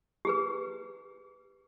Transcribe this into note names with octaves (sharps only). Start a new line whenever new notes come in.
G4 G#4 B4